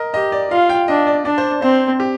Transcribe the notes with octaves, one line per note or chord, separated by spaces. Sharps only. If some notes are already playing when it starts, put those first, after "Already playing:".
Already playing: A#4 D#5
G4 D#5
D5
F4 F5
G5
D4 D#5
D5
D4 D5
C5
C4 C5
G4